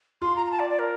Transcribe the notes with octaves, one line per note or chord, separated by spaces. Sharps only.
F4 C6
A#5
A#5
A5
D5
D5
A#4